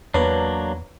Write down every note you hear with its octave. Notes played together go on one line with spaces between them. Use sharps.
E2 F#3 A#3 D4 B4 C#5